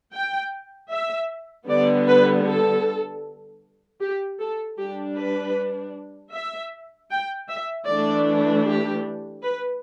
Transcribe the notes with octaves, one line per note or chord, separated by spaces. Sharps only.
G5
E5
D3 G3 B3 D5
B4
A4
G4
A4
G3 D4 G4
B4
E5
G5
E5
E3 A3 D4 D5
G4
B4